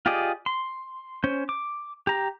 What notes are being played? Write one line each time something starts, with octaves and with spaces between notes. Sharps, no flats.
F4 G4 G#4 D5 D#5
C6
C#4 C5
D6
G4 A#5